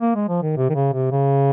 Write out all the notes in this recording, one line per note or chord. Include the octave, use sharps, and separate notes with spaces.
A#3
G#3
F3
D#3
C3
D#3
C#3
C3
C#3